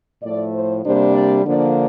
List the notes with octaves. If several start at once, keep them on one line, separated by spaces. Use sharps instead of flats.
A2 F3 A3 D5
C5
C3 G3 A#3 D4 C5
D5
D3 F3 A#3 D4 D5